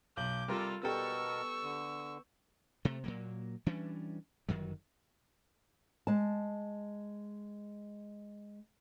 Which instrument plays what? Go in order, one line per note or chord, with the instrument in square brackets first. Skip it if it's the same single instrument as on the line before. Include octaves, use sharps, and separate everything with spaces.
[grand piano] B1 F#7 [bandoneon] D6 [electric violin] G6
[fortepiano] C3 A#4 [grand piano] G3 [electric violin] F4 A4
[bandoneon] B2 A#4 [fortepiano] G3 A4 [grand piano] B3 G5 [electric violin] C#6 E6
[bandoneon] D3
[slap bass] C3 A3
A#2 F#3 A#3
E3 G3 C#4 D4
G1 F#2 D#3 F#3
[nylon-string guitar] G#3 A5